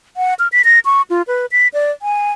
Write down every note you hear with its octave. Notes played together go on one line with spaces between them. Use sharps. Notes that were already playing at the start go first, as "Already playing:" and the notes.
F#5
F6
B6
A#6
C#6
F4
B4
B6
D5
G#5